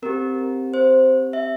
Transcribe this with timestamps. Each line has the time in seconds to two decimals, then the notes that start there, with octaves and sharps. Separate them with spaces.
0.02 C4 G4 A#4
0.74 C5
1.33 E5